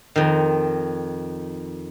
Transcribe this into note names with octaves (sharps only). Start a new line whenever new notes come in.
F2 D#3